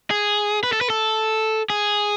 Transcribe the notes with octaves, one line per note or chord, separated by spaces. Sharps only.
G#4
B4
A4
B4
A4
G#4